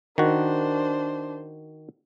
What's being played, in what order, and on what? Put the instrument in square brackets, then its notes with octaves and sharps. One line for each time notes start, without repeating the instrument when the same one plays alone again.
[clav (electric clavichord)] D#3 F#4 [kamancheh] D4 C5